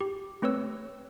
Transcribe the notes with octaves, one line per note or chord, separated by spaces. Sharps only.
G4
A3 C4 B4 C#5 E6